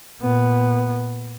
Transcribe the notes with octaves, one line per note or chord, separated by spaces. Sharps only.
A#2 B3